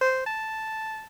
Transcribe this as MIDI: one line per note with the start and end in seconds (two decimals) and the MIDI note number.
0.01 0.23 72
0.26 1.06 81